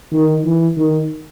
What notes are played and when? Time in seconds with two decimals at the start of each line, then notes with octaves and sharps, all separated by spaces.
0.13 D#3
0.45 E3
0.77 D#3